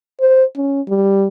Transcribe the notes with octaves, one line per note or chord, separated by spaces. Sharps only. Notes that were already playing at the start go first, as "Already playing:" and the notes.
C5
C#4
G3